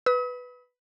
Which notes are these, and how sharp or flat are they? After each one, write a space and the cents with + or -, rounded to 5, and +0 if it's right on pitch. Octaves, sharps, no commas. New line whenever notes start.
B4 +0 D#6 +45